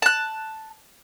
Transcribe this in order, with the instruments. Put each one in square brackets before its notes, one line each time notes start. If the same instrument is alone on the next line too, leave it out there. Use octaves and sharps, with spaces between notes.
[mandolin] A5 F#6